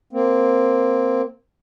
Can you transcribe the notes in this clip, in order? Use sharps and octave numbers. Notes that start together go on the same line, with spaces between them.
A#3 C4